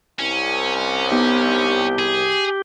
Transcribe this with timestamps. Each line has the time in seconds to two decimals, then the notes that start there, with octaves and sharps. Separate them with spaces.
0.19 C2 C#4
1.12 B3 D#4 G4
1.99 G#4